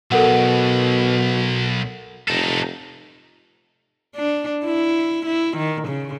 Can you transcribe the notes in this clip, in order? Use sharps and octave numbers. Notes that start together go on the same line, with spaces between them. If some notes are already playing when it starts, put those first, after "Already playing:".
B1 B2 A4 A#4 F#5
F1 D#4 A4
D4
E4
E4
D#3
C#3